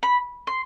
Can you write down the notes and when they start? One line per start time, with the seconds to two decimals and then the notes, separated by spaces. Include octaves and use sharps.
0.03 B5
0.47 C6